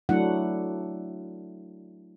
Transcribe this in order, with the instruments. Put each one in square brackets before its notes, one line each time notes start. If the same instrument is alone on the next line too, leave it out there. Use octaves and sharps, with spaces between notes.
[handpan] F#3 A3 D4 E4 F#5